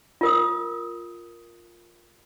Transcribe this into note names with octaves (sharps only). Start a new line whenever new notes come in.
F4 A#4 D#6